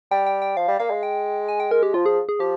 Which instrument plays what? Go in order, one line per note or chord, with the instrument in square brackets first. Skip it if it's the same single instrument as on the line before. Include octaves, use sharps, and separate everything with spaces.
[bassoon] G3 [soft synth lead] G5
[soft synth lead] G5
G5
[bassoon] F3 [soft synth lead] F5
[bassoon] G3
[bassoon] A#3 [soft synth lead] F5
[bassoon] G#3
[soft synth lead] G5
G#5
G5
A#4
G4
[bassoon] F3 [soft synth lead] F4
[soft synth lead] G#4
G#4
[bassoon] F3 [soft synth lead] G4